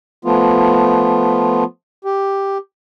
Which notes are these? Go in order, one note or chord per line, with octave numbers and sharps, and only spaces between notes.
F3 A3 B3 F4
G4